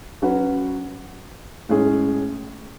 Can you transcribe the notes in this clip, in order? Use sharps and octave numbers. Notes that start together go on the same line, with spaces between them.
F#3 C#4 F#4 B4
A2 G#3 C#4 G#4